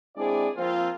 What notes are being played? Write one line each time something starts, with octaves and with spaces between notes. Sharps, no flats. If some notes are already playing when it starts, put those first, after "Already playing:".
G#3 C4 D4 E4 G#4 D5
F3 A#3 C4 F4